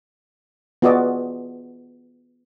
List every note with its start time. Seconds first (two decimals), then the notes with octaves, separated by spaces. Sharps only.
0.82 B3 F4 F#4 G#4 D5 D#5